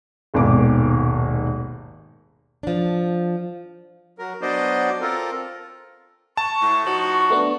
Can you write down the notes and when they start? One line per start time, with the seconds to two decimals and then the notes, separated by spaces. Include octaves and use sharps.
0.34 D#1 G#1 G#2 B2 D6
2.63 F3 D4
4.19 F#3 A#4
4.42 F#3 B3 D4 C5 D5 D#5
5.01 C4 F4 A4 A#4
6.37 A5 C#6
6.61 A2
6.85 F3 D#4 F#4
7.30 A3 B3 D4